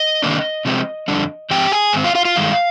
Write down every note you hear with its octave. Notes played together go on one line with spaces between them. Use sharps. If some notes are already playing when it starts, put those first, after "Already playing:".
Already playing: D#5
C3 D#3 A#3 D4
C3 F3 G#3 C4
F2 D3 G3 D4
G#2 F3 C4 G4 G5
G#4 G#5
G#2 D#3 C4
F4 F5
F4 F5
F4 F5
G2 D#3 G#3